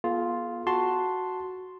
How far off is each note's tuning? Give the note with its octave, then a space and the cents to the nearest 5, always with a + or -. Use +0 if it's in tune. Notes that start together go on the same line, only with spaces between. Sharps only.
B3 -40 F4 +0 G#4 +45
F#4 +0 A5 +0 C6 +0